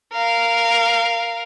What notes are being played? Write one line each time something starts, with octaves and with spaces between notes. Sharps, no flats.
A#4 F5